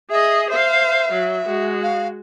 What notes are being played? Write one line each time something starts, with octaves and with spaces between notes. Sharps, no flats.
G#4 D#5 E5
C5 E5 F5
F#3
G#3 F#4
F5